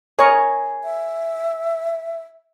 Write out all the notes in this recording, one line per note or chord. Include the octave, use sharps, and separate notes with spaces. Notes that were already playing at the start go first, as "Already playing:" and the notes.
G#4 A#4 C#5 D#5 C#6
E5